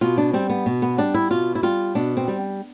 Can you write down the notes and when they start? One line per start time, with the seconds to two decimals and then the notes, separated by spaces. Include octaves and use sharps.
0.01 B2 F4
0.18 D4
0.33 G3 C4
0.50 B3
0.66 B2
0.82 B3
0.98 G3 D4
1.14 E4
1.30 B2 F4
1.55 E4
1.63 G3 F4
1.95 B2 D4
2.17 C4
2.28 G3